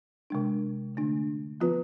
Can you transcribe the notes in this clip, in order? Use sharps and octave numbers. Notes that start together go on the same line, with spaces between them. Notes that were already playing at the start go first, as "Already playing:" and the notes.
C3 G#3 D4
D3 A3 D4
F3 B3 F4 B4